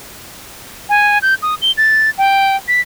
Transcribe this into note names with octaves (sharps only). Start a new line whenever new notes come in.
G#5
G6
D#6
G7
A6
G5
B6